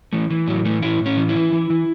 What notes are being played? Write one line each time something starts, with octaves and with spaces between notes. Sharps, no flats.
E3 A3
E3
A2 F#3
E3 A3
A2 E4
A2
C#4
E3
E4
E3
E3
E3